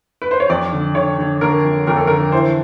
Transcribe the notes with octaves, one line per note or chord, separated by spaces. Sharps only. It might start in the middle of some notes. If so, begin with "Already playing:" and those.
B4
C5
C#5
F2 D5
D3
D3 C#5
D3
D3 A#4
F2
F2 A#4
A4
D3 A#4
E3 C5